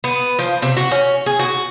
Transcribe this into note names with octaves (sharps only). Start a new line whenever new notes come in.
B3
F3
C3
F#4
C#4
G#4
F#4